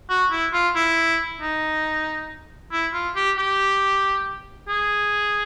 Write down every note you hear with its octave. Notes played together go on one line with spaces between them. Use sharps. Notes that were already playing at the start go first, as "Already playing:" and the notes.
F#4
E4
F4
E4
D#4
E4
F4
G4
G4
G#4